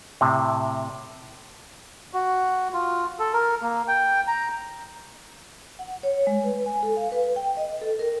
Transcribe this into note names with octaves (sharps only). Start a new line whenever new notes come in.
A2 C3
F#4
F4
A4
A#4
A#3
G5
A#5
F#5
C#5
G#3
B4
G#5
A4
F5
B4
G5
D#5
A4
A#4